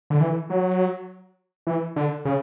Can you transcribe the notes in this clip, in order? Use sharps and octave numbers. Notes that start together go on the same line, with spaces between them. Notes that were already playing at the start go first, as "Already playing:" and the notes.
D3
E3
F#3
E3
D3
C#3